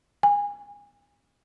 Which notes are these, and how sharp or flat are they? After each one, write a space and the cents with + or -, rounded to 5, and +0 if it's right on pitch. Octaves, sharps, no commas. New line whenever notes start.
G#5 -25